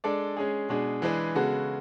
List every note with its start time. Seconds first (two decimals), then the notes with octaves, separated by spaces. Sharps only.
0.04 G#3 D4 A4 D5
0.37 G#3 C#4 G#4
0.69 B2 G#3 D4 G#4
1.02 E3 G#3 D4 G#4 B4
1.35 C#3 G#3 B3 F#4 A4